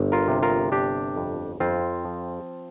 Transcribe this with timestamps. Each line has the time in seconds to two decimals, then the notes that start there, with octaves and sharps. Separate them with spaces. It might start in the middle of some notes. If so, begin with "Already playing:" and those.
Already playing: G1
0.12 F4 A#4
0.28 C3
0.42 F4 A#4
0.72 G1 D4 G4
1.16 F2
1.60 F2 C4 F4
2.05 F3